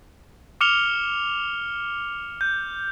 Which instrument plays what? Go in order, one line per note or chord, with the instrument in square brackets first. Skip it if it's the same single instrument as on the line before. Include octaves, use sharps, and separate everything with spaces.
[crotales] D6 F6 C#7 F7 G7
G6